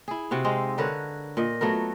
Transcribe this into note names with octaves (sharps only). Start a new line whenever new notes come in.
E4 G#4
C3 F#4 F5
G#3 C4 D#4 F5
D3 A#4 B4 C#5
A#2 D#5
F#3 A3 B3 A#4